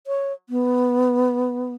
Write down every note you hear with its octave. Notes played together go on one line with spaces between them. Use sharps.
C#5
B3